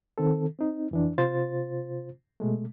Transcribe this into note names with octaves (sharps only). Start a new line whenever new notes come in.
D#3 C4 A4
C4 D#4
F2 E3 D4
C3 F4 C5 A6
B2 G#3 A3